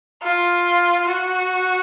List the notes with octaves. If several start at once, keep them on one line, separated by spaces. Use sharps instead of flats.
F4
F#4